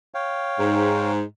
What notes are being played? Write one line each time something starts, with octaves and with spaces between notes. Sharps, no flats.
C#5 F5 G5
G#2